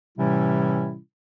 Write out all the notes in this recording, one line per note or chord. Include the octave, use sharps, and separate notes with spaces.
A2 C3 E3 G3 C#4 E4